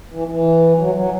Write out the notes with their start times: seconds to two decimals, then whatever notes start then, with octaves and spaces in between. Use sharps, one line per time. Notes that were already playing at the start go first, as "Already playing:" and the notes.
0.11 E3
0.28 E3
0.78 F#3
0.95 F#3